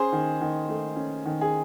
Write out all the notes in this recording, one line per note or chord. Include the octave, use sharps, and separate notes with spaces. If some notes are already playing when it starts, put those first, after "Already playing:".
Already playing: C#4 G#4 C5
D#3
D#3
A3
C#4
D#3
G#4